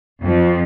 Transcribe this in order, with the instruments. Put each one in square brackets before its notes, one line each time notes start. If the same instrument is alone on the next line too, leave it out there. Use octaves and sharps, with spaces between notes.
[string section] F2